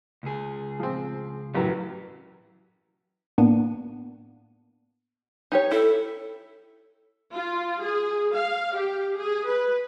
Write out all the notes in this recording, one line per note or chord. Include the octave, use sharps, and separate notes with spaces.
C#2 G#4
F3 C4
A1 F#2 E3 F#3
A2 A#3 B3 D4 D#7
D#4 G4 C#5
E4 A4
F4
G#4
F5
G4
G#4
B4